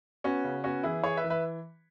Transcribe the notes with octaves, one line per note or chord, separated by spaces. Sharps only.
B3 C#4 F#4
C#3
B3 C#4 F#4
E3 E4 G#4
E3 G#4 C#5
B4 E5
E3
B4 E5